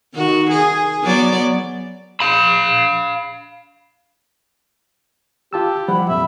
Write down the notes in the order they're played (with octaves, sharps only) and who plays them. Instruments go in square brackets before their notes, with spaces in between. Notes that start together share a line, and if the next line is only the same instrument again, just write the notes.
[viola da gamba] D#3 F#4
G#4
F#3 B3 D5
[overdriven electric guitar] F5 B5
[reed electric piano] F4 A5 E6 [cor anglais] G4
[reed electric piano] F3 G3 F#5 [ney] B5
[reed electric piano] F2 A#2 [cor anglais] E5